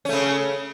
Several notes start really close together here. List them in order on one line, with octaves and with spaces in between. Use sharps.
C#4 A3 C#3